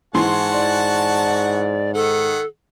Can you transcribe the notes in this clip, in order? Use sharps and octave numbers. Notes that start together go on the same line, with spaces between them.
G#2 E3 F#4 F#5 A5 C6
D5
D#3 A4 F#5